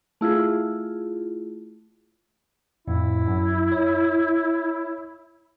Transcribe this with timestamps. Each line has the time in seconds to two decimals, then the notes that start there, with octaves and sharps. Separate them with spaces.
0.21 A3 E4 F4 G#4
2.88 F2 A2 E4
3.28 F#2
3.72 C#5